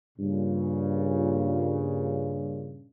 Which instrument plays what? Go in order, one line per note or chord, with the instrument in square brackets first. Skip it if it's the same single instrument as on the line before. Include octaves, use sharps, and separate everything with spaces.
[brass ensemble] G2 A#2 C#3